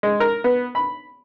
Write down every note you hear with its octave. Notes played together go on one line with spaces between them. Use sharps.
G#3
A#4
B3
B5